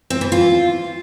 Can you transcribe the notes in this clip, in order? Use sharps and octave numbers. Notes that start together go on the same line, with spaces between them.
C4
E3
F4